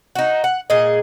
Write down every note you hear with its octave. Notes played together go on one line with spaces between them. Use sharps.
D#4 F#4
F#5
A#2 G#4 D#5